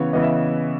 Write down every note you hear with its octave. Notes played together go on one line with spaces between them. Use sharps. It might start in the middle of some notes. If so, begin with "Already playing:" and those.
Already playing: C#3 E3 B3 C#5
C#3 E3 B3 D#5
E5